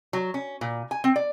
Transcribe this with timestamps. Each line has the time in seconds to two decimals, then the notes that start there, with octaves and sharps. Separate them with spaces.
0.13 F#3
0.34 C#4
0.61 A#2
0.91 G#5
1.04 C4
1.16 D5